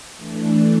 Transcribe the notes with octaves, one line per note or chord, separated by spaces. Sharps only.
E3 A3 D4